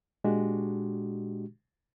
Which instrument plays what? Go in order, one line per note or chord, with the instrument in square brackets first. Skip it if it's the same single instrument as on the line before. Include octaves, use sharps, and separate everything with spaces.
[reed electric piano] A#2 G#3 D4 F#4 G4